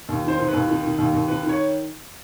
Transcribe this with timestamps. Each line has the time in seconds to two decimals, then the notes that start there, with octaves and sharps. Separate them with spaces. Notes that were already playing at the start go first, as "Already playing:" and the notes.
0.08 D#2
0.24 D#3 C5
0.38 D#3
0.48 D#2 B4
0.68 D#3
0.83 D#3
0.98 D#2
1.13 D#2
1.28 D#3 B4
1.43 D#3
1.49 C#5